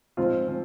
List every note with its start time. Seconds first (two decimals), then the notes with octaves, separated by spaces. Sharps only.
0.17 G#2 F3 C4 F4
0.48 F3 C4